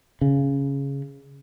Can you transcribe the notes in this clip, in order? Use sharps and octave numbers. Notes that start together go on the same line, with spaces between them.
C#3